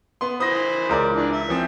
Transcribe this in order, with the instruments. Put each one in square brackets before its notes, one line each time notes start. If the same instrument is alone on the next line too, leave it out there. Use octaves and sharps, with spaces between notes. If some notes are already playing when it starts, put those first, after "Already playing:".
[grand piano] B3 C6
[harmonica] E3 C5 B5 [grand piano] D#6 A#6
[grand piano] C#2 A#4 D5
[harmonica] E3 D4
E5
[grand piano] E3 F3 C4